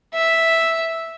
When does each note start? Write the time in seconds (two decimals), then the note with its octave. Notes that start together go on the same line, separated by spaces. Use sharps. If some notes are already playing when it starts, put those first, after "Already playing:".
0.14 E5